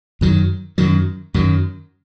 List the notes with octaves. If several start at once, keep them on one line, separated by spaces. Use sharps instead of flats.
F#2 D#3 F#3
F#2 D#3 F#3
F#2 D#3 F#3